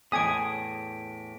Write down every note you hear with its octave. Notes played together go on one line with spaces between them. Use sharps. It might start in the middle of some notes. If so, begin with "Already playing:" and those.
E2 A2 G#5 D#6 B6 D7